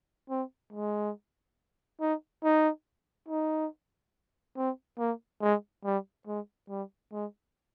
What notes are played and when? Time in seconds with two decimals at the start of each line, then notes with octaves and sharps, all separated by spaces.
0.30 C4
0.73 G#3
2.01 D#4
2.44 D#4
3.28 D#4
4.57 C4
4.99 A#3
5.41 G#3
5.85 G3
6.27 G#3
6.69 G3
7.12 G#3